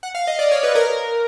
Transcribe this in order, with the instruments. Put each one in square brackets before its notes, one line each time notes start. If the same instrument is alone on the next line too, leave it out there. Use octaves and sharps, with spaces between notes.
[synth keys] F#5
F5
D#5
D5
C#5
B4
A#4